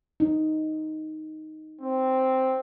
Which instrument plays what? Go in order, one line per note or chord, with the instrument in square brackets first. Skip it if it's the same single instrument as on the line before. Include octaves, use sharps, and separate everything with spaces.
[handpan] D#4
[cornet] C4